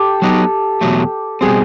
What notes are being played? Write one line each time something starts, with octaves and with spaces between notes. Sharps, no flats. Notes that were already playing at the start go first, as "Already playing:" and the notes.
Already playing: G4 A4
F#3 B3 D#4
E2 B2 F#3 A3
B2 G3 C4 G#4